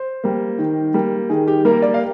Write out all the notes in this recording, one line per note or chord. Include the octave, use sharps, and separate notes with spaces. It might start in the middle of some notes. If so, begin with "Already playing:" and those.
Already playing: C5
G3 A#3
D#3
G3 A#3
D#3 G#4
G4
G3 A#3 A#4
D5
F5